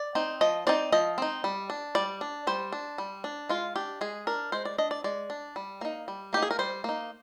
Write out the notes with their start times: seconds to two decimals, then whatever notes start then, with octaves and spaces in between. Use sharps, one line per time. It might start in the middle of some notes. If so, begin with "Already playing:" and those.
Already playing: D5
0.15 C4 D#4
0.41 F3 D#5
0.67 C4 D#4 D5
0.92 F3 D#5
1.18 C4 D#4
1.44 G3
1.70 D4
1.95 G3 D5
2.21 D4
2.47 G3 C5
2.72 D4
2.98 G3
3.24 D4
3.49 G#3 F4
3.76 D4 G4
4.01 G#3 G#4
4.27 D4 A#4
4.52 G#3 C5
4.65 D5
4.78 D4 D#5
4.91 D5
5.04 G#3 D5
5.30 D4
5.56 G3
5.81 A#3 D#4
6.08 G3
6.33 A#3 D#4 G4
6.42 G#4
6.51 A#4
6.59 G3 C5
6.84 A#3 D#4